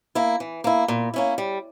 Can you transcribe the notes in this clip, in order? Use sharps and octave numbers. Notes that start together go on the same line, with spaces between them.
A#3 E4
E3
A#3 E4
A#2
A#3 C#4 E4
G3